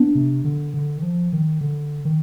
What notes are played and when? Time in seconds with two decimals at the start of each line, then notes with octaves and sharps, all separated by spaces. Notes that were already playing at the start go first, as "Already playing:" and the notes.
Already playing: B3 D4
0.15 C3
0.45 D3
0.74 D3
0.98 D#3
1.02 F3
1.33 D#3
1.61 D3
2.05 D#3